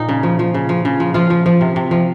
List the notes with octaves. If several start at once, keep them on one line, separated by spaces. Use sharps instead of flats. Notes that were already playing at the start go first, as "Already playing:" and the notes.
Already playing: A#2 D#4
C#3
F3
F3
C#3
F3
C#3
F3
F3 F4
F3
F3
C3
C3
F3